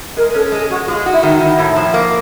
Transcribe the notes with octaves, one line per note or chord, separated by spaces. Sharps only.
G#3 A#4
C#4 A4
G#3 G#4
G#3 F#4
G#3 F4
F#4
E4
D#3
E4
D#3
A2
F3
A#3